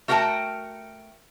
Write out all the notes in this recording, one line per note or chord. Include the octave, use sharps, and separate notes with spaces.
A3 F#4 A#4 F#5 G5 A5